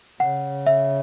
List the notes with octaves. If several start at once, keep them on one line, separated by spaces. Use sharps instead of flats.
C#3 F#5
E5